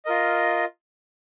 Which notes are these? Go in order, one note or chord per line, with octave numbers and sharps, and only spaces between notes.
F4 A#4 D#5